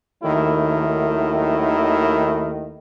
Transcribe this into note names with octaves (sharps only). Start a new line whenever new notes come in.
D#2 D#3 F#3 A3 E4